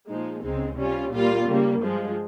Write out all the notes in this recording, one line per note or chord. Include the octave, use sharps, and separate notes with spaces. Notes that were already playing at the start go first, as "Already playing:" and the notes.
A#2 F3 G#3 D#4
C#2 C#3 G#3 C4 D#4
C3 G3 C#4 F4
A#2 G3 A#3 F4
C#3 G3 A#3
G2 F3 G#3